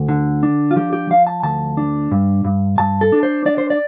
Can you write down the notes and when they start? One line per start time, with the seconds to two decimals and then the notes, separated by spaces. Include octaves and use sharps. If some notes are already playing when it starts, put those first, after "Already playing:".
Already playing: D2
0.09 D3
0.43 D4
0.71 F4
0.76 F3 G4
0.93 G4
1.10 F3 F5
1.27 A5
1.43 D2 A5
1.77 D4
2.11 G2
2.45 G2
2.78 G2 A5
3.01 A4
3.12 D4
3.23 C5
3.46 D4 D5
3.58 C5
3.70 D5